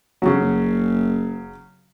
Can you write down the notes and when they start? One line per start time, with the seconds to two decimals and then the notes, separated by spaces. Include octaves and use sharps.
0.22 G1 C#3 F#3
0.39 F#1